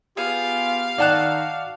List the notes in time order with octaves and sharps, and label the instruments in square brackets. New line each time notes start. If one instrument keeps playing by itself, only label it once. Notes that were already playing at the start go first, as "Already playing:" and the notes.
[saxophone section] B3 F4 G4 [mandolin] G#4 [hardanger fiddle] F5
[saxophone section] D#3 D#4 [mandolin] F#4 A5 F#6 [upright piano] D5 F#5 G5